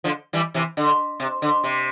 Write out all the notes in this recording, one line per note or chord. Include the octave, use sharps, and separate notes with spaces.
D3 F3
E3 G3
C3 E3
D3
C3
D3
C3